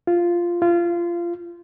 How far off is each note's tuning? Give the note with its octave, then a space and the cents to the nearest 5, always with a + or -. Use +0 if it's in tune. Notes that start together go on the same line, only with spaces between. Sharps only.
F4 -5
F4 -20